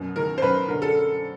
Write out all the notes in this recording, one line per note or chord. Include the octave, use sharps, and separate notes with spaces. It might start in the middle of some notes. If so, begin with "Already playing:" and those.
Already playing: F#2 B2
D#3 A#4
C5
F#2 B4
D3 A#4
A4